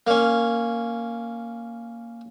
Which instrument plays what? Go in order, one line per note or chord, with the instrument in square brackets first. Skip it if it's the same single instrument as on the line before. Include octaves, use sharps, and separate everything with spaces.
[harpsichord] A#3 C#4